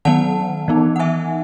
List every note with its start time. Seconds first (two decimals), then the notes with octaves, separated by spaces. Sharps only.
0.05 D#3 F#3 B3 F#5 A5
0.68 E3 B3 D#4
0.96 F#5
0.99 E5 G#5